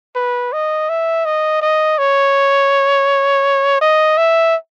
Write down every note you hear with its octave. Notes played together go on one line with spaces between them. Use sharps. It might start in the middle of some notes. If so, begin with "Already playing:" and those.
B4
D#5
E5
D#5
D#5
C#5
D#5
E5